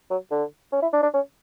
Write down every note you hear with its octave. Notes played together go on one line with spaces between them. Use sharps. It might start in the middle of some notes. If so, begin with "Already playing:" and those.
F#3
D3
C#4
E4
D4
D4
C#4